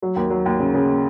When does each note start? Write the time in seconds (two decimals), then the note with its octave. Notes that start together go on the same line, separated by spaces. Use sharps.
0.02 F#3
0.16 D#2
0.30 F#3
0.45 D#2
0.60 C#3
0.74 C#3